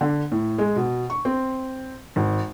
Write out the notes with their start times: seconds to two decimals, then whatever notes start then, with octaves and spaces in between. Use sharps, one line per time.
0.01 D3
0.32 A2
0.58 G#3
0.76 B2
1.10 C#6
1.25 C4
2.16 G#1